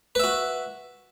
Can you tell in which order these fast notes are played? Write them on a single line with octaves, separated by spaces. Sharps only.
B4 E5 F#4